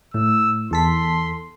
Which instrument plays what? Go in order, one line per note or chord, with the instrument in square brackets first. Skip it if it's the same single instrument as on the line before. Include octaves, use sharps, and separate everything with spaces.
[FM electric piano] A2 [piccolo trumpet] E6
[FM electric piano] E2 A4 B6 [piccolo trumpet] C6